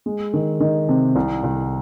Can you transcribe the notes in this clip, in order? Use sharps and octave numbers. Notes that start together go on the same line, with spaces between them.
G#3
D#3
D#3
C3
C2
C2